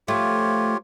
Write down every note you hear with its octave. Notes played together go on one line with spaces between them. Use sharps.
F3 A3 F4 G4 C#5